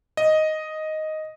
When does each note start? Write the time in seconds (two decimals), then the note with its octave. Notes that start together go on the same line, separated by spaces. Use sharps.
0.17 D#5